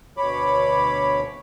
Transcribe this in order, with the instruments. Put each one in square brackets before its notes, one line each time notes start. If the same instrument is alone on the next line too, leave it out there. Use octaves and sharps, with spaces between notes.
[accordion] D2 B2 C#5 B5 D6